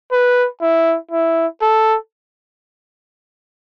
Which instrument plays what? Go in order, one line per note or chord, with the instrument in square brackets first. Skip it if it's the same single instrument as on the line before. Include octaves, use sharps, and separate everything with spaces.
[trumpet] B4
E4
E4
A4